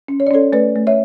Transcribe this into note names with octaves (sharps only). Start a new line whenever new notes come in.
C#4
C#5
D5
C#4 A4 C#5
A3 B4 D5
A3
C#5 E5